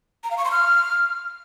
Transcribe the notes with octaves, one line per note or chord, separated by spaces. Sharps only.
A#5
F5
C#6
C6
F6